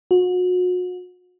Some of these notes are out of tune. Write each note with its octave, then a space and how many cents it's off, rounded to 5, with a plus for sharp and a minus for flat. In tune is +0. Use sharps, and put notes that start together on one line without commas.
F#4 -35